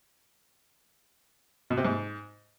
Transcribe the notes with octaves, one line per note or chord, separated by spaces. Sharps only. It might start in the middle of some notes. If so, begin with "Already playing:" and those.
B2
C3
G#2